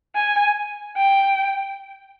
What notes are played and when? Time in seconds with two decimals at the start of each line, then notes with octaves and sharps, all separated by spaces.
0.15 G#5
0.97 G5